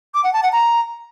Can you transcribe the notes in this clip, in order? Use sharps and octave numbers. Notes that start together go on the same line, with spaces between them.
D6
F#5
A5
F#5
A#5